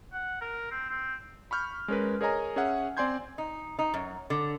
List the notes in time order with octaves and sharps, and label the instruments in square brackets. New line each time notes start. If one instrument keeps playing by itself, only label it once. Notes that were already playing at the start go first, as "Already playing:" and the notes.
[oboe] F#5
A#4
C4
C4
[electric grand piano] B5 C#6 F6 G6
G#3 C#4 A#4 B4
G#4 A#4 C#5 D#5 G#5 A#5
C#4 G#4 C#5 E5 F#5
C4 D5 G#5 C6 G6 G#6
[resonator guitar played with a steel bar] D#4
D#4
F#2
D3